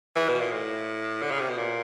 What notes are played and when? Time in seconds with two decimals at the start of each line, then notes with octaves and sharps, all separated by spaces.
0.16 E3
0.29 B2
0.41 A#2
0.52 A2
1.22 D3
1.31 C#3
1.40 C3
1.50 B2
1.57 A#2